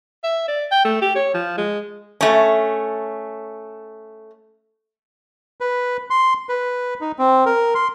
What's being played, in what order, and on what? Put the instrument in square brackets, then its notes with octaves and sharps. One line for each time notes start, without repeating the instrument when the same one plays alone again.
[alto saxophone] E5
D5
G5
A3
G4
C#5
F3
G#3
[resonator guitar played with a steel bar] A3 C#4
[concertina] B4
C6
B4
D#4
C4
A#4
C6